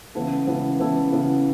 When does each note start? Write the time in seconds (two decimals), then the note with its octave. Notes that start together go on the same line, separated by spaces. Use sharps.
0.15 C#3 E3 B3 E4 A4
0.47 C#3 E3 B3 E4 A4
0.79 C#3 E3 B3 E4 A4
1.12 C#3 E3 B3 E4 A4